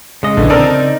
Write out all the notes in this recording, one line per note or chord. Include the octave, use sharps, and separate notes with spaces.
C#3 G#3 D#5
A#1 D3 E3
C#3 C4 D#4 A4 A#4 D5
D#4